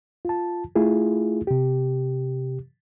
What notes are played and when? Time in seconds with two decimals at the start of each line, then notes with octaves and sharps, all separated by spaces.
0.25 F4 A5
0.76 A3 E4 F4 G#4
1.47 C3 G4